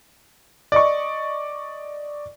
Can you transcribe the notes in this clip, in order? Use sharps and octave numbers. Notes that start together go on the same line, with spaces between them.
D5 D#5 C#6